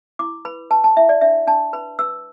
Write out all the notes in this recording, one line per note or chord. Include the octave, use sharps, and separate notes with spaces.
E4 D6
B4 B5
B4 A5
A5
E4 E5
D5
D4 E5
D4 A5
B4 B5
B4 E6